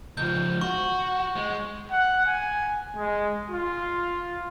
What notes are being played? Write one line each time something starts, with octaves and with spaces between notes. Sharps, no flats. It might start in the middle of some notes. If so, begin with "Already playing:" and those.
C#2 F3 G6
F#4 C#6
G#3
F#5
G#5
G#3
F4